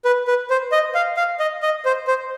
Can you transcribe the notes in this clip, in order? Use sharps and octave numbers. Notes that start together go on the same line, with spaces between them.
B4
B4
C5
D#5
F5
F5
D#5
D#5
C5
C5